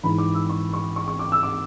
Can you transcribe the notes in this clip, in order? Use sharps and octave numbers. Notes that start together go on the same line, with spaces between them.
G#2 E3 B5
D6
E6
C#6
C#6
C#6
C#6
D6
E6
D6